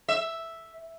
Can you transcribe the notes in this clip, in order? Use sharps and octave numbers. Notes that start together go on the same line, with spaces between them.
E5